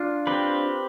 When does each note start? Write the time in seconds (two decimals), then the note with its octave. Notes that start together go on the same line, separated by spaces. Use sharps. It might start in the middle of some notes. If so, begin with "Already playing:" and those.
Already playing: D4 F4
0.27 C4 G4 B4